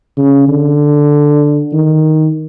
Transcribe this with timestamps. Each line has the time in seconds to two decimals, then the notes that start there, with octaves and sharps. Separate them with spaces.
0.17 C#3
0.48 D3
1.73 D#3